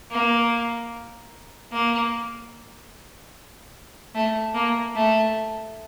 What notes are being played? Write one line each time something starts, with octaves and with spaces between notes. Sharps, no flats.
A#3
A#3
A3
A#3
A3